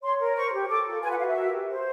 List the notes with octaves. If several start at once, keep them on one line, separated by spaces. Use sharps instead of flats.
C#5 C6
A#4
C5 C#6
G4
A4 D6
F4
B4 G#5
F#5
F#4 F5
E5
A#4
G4
C5